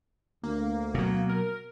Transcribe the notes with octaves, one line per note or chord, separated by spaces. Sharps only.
D2 A#3
B2 F#3
A#4